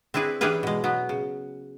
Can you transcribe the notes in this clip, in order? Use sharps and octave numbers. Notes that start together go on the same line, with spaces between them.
C4 D4 E4 G#4 B4
E3 C#4 D4 G4 G#4 B4
B2 G#3
F#3 B3
C#3